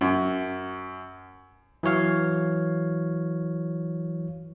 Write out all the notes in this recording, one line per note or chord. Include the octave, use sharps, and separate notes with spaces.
F#2
E3 F#3 C#5 F5